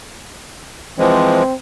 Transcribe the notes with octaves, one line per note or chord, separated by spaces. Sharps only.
E3 F3 G#3 C4